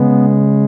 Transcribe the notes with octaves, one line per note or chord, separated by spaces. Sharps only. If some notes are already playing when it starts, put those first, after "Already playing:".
Already playing: C#3 G#3 B3